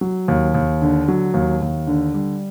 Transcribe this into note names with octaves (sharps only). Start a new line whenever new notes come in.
F#3
D#2
D#2
D3
F#3
D#2
D#2
D3
G3